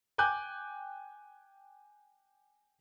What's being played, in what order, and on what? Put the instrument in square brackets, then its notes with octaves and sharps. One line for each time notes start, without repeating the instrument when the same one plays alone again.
[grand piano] G5 G#5 D6 F#6 G6